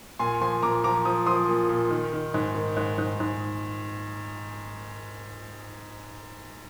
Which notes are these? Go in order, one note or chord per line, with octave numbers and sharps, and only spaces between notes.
A#2 G#5 C6
F3 G#5 C6
A#2 A#5 D6
F3 A#5 D6
F3 D#6
F3 C6 D#6
A#2
A#2
D#3
D#3
G#2
D#3
G#2
G#2
G#2